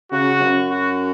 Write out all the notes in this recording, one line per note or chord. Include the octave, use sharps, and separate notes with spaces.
C#3 F#4
F#2
F#4